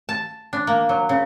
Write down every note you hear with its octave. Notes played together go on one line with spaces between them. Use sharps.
A5
D4
A#3
F#3
C#3